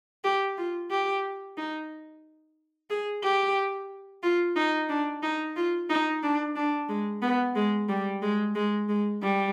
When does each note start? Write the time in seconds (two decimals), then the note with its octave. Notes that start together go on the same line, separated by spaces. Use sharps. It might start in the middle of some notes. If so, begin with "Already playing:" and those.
0.24 G4
0.57 F4
0.90 G4
1.57 D#4
2.90 G#4
3.23 G4
4.23 F4
4.56 D#4
4.89 D4
5.23 D#4
5.56 F4
5.89 D#4
6.23 D4
6.56 D4
6.89 G#3
7.22 B3
7.56 G#3
7.89 G3
8.22 G#3
8.55 G#3
8.89 G#3
9.22 G3